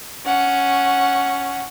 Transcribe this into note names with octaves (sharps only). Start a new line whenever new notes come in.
C#4 F#5